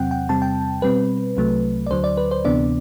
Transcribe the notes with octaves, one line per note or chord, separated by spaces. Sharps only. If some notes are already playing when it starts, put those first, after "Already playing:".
Already playing: E2 C3 F#3 C4 F#5 G5
G5
E2 C3 G3 C4 A5
G5
B2 G3 C4 B4
C2 C3 F#3 A3
D5
D2 D3 F#3 C5
D5
B4
C5
D2 C3 E3 B3 D4 D5